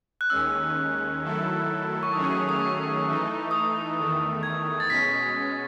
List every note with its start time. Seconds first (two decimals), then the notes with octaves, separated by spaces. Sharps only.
0.21 F#6
0.30 D#2 D#3 G#3 C#4 E6
1.22 D#3 F#3 A3 E4 A4
2.03 C#6
2.13 D#3 F#3 A3 C#4 G#4 D#6
2.25 C#6
2.36 D#6
2.49 D#6
2.59 C#6
3.06 E3 A3 D#4
3.51 D#6
3.97 E2 D#3 A3
4.43 G#6
4.80 A6
4.89 B2 G#3 C#4 B6